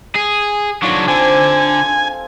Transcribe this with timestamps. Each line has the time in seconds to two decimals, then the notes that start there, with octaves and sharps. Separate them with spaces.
0.15 G#4
0.82 F#3 D4 D#4 F4 A4
1.08 D3 C4 G#5